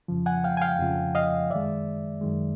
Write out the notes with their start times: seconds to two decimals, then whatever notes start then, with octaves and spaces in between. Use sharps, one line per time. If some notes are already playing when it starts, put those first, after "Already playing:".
0.08 F2 C#3 F3
0.26 F#5 G#5
0.44 F5 G5
0.57 G#5
0.62 F5 G5
0.79 F2 C#3 F3
1.15 D#5 F5
1.51 F#2 D#3 G#3 D5 E5
2.21 F#2 D#3 G#3